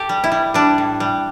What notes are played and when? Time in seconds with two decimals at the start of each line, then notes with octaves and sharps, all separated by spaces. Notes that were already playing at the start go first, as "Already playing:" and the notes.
Already playing: G4 A4
0.09 G3
0.24 E4
0.31 G3
0.54 G3 D4
0.78 A2
1.00 G3